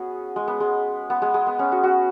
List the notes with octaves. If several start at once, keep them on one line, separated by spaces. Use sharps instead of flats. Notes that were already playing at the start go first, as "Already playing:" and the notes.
Already playing: B3 C#4 F#4 G#4
G#3
B3
G#3
B3
G#3
G#3
B3
C#4
F#4
F#4